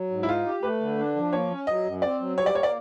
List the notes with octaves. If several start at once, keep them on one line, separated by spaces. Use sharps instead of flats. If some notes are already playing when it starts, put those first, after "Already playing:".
Already playing: F#3
G#2
E4
D#4 F4
G4
A3 B4
D3
D4
F3
A#3 C#5
C#4
F#3 D#5
F#2
C4 D5
F#3
G3 C#5
D5
A#3 C#5
D5